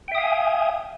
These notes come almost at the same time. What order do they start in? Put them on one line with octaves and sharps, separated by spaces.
G5 E5 D#6 F5 G#5